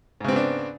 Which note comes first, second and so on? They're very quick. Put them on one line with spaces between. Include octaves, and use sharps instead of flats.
G#2 C#3 C4 B3 D4